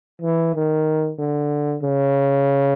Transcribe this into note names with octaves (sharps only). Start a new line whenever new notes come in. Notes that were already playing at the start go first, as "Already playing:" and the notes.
E3
D#3
D3
C#3